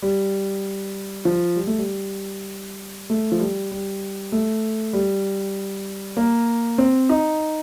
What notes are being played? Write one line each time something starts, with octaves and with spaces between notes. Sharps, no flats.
G3
F3
G3
A3
G3
A3
F3
G3
G3
A3
G3
A#3
C4
D#4